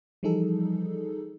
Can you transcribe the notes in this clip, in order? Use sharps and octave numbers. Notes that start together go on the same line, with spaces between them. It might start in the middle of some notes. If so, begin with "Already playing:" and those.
E3 F3 G3 D#4 G#4 A4